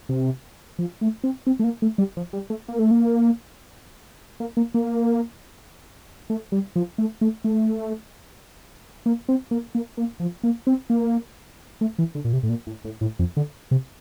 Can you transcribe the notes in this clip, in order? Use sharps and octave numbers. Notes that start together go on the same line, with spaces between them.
C3
F3
A3
C4
C4
A3
A#3
A3
G3
F3
G3
A3
A#3
A3
A#3
A#3
A#3
A#3
A3
G3
F3
A3
A3
A3
A#3
C4
A#3
A#3
A#3
F3
A#3
C4
A#3
A3
E3
D3
A#2
C3
A2
A#2
A2
A2
A2
F2
D3
C3